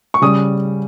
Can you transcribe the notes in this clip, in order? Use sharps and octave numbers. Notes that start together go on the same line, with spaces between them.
C#6
C#3 G3 D#6